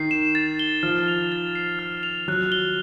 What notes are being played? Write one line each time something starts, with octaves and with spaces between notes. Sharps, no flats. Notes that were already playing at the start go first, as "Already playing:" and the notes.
Already playing: D#3 C7
E7
A6
G7
F3 F6
F7
A6
C7
F6
F7
F#3 F#6
G7